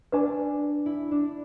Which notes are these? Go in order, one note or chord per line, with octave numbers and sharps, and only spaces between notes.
D4 B4 D5 G#5
E4
D4